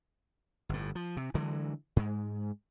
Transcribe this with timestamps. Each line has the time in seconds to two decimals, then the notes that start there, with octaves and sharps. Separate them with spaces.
0.69 G1 A2
0.95 F3
1.17 C3
1.34 D3 E3 F#3 G#3
1.96 G#2 G#3